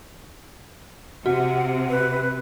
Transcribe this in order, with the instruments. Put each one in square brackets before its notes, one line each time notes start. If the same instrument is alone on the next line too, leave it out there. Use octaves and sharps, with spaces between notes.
[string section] C3 [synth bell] F#4 [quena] F#5
[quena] B4